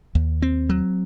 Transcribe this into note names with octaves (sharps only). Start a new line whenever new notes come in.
D#2
C4
F#3